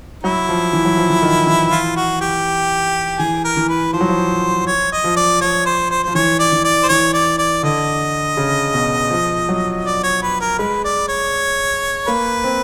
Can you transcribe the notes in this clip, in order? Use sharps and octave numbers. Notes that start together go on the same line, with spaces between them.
F#3 E4
F3
E3
F#3
F3
E3
D#3
E3
F4
F#4
G4
E3 G#4
A#4
E3
B4
F3 C5
F#3
F3
C#5
D#5
F3
D5
F3 C#5
C5
C5
F3 C5
E3 C#5
D5
E3
D5
C5
E3 C#5
D5
D5
D3 D#5
C#3
B2
F3
F#3
D5
C#5
B4
A#4
G#3 B4
D5
C#5
A#3 B4
C4